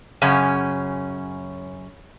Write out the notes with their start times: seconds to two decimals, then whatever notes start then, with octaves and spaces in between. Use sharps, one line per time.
0.22 F#2 C#3 C#4